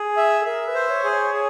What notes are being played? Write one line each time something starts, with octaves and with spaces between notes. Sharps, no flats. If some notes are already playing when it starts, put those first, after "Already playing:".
Already playing: G#4
E5
A4
A#4 E5
B4
C5
C#5
G#4
C#5
G#4